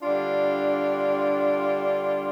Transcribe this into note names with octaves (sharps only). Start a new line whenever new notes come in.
D3 G3 D4 F4